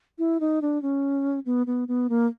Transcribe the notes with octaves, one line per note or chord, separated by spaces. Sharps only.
E4
D#4
D4
C#4
B3
B3
B3
A#3